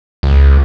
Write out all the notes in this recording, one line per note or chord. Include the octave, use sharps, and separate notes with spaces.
C#2